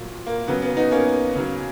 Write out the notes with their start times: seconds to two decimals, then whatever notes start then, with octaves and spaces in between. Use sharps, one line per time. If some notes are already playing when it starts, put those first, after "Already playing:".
Already playing: A#2 F#3
0.26 A#3
0.47 C#3 F#3 B3
0.62 B3
0.77 B3 D#4
0.91 A#3 C#4
1.35 C#3 F#3